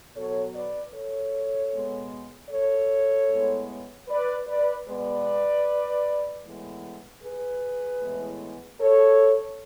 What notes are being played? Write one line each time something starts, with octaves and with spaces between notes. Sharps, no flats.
B2 F#3 B3 A4 C#5
B4 D5
A4 C#5
B2 G#3 B3
A4 C#5
A2 G#3 B3
B4 D5
B4 D5
B2 G#3 B3 B4 D5
A2 E3 G#3 B3
G#4 B4
A2 E3 G#3 B3
A4 C#5